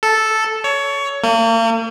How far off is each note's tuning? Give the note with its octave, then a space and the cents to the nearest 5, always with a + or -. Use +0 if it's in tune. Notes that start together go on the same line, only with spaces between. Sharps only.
A4 -5
C#5 +20
A#3 -40